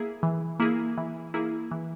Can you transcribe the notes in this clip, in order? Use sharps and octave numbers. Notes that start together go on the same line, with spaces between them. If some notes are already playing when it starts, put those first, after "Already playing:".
Already playing: A#3 E4 G#4
E3
A#3 E4 G#4
E3
A#3 E4 G#4
E3